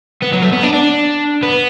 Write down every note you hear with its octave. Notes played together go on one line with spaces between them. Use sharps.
B3
F#3
A3
B3
D4
D4
B3